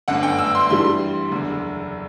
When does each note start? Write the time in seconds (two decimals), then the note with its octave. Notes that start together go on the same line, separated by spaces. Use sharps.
0.08 G1 F#2 D3 F#5
0.23 G5
0.39 E6
0.55 C6
0.70 G2 E3 G3 C6
1.31 F#1 E2 D3